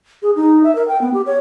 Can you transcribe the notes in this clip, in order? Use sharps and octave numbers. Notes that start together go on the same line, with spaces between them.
G#4
D#4
E5
A#4
G5
B3
G4
C#5